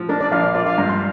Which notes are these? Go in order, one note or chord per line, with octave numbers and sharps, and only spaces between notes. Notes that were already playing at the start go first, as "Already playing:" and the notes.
Already playing: F3
D4 A#4
D5
A#1 F5
D5
F4 D5
F5
G2 A#5
C6